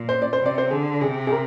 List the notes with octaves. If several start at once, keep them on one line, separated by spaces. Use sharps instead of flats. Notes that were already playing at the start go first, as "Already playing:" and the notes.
Already playing: A#2
C5
D5
C5
C3
D5
C5
D3 G#4
C3 G#4
G#4
A#4